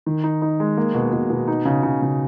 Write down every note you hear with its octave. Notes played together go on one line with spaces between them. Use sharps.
D#3
D#4
D#4
G#3
A#3
B2
B2
B2
D#4
C#3
C#3
C#3